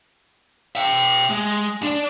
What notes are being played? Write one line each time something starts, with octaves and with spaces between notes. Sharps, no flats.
E5 G5
G#3
D4 D5